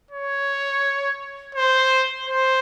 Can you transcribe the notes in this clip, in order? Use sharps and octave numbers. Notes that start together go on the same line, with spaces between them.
C#5
C5
C5